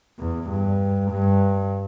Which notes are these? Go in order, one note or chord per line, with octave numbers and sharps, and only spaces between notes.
E2
G2
G2